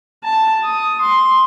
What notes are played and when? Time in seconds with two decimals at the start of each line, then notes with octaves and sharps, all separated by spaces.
0.24 A5
0.64 D#6
1.01 C6